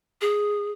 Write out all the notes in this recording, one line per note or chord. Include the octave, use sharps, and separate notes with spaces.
G#4